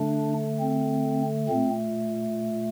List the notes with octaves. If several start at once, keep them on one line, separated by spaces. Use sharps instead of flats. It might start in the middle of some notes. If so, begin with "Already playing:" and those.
Already playing: D3 A3 D4
C4
A#2 A3 C4